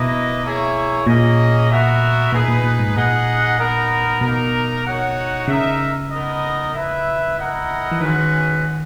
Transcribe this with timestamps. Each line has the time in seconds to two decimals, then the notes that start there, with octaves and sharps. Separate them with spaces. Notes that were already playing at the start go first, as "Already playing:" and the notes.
Already playing: B2 A#3 E4 B4 D#5
0.43 A#3 E4 G#4 C#5 E5
1.06 A#2 A#3 C#4 G#4 D#5
1.70 B3 F#4 A#4 E5
2.32 A#2 D#4 G#4 B4
2.48 A#2
2.63 A#2
2.79 G#2
2.96 A#2 D#4 G#4 D#5 F#5
3.58 B3 D#4 A#4
4.21 B2 A#3 D#4 A#4
4.85 D#4 F#4 C#5 F#5
5.47 C#3 D#4 A#4 E5
6.11 B3 D#4 A#4 D#5
6.74 E4 B4 E5
7.37 E4 A#4 D#5 F#5
7.91 E3
8.00 D#3 G#3 C#4 F#4 B4